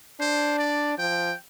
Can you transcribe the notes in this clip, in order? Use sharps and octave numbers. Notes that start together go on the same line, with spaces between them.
D4 C5
D5
F3 G5